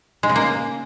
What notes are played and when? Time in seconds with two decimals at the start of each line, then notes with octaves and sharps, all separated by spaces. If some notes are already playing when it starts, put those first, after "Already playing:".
0.23 G#3
0.29 C#3
0.36 A#3